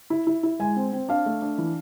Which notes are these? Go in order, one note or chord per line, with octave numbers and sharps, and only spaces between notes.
E4
E4
E4
G#3 G#5
C4
C4
D4 F5
A3
D4
E3